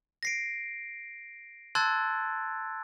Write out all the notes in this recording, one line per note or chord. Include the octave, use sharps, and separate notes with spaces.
A#6 C7 D7
A5 C6 E6 F#6 G#6 A6